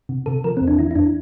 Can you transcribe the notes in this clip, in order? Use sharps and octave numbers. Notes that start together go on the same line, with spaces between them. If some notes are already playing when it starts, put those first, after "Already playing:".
C3
C3 A4
F3 A#4
E2 C4
D4
E3 E4
E4
F2 D4